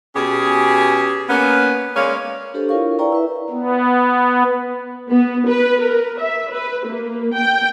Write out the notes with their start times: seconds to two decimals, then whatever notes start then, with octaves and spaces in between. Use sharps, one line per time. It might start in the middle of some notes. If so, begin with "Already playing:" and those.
0.14 B2 C#4 G4 G#4
1.29 A#3 B3 C#4
1.95 G#3 A#3 C#4 C#5 D5 F5
2.54 D4 G4 A4 C5
2.69 E4 F4 A#4 C#5 F5 C#6
2.99 E4 B4 D5 G5 A#5 C#6
3.12 E4 B4 E5
3.50 B3
5.09 B3
5.47 B4
5.81 A#4
6.20 E5
6.50 B4
6.87 A#3
7.34 G5